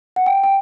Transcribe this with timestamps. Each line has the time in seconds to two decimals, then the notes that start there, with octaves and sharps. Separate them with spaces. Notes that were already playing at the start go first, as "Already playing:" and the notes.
0.16 F#5
0.26 G5
0.44 G5